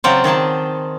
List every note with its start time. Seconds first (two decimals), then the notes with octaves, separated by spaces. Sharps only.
0.04 C#3 F#3 C4 F4 D5
0.24 D#3 G#4 D5 A5